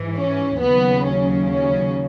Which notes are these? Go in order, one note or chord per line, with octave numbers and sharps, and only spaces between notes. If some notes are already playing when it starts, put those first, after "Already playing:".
Already playing: G#2 E3
C#4
D#2 C#3 F#3 B3
C#4
C#4